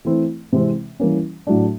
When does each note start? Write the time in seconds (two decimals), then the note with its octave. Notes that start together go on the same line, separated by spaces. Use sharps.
0.05 E3 A3 C4 E4
0.52 C3 E3 G#3 C4
1.00 E3 G3 A#3 C#4
1.47 A2 F#3 A3 D4